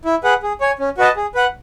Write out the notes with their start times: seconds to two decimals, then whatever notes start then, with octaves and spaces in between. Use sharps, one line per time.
0.05 E4
0.24 G#4 B4 F#5
0.43 G#4
0.61 C#5 G#5
0.79 C#4
0.98 F#4 B4 D#5 A5
1.16 G#4
1.35 B4 F#5